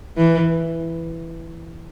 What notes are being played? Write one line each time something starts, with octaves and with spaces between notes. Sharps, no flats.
E3